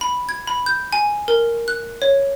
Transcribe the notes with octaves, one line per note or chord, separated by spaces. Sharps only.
B5
G#6
B5
G6
G#5
A#4
F#6
C#5